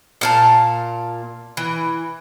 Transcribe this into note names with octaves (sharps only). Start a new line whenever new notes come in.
A#2 F5 A5
E3